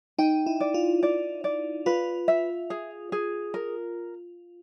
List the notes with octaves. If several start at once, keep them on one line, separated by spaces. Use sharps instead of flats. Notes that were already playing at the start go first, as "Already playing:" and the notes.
D#4 G5
E4
D5
F4
D5
D5
F4 B4
E5
G#4
G#4
A#4